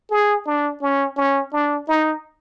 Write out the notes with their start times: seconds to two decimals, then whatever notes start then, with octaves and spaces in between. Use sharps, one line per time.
0.10 G#4
0.46 D4
0.82 C#4
1.17 C#4
1.53 D4
1.88 D#4